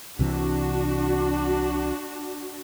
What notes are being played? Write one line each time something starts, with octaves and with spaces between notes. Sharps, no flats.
C2 C3 E3 D4 F#4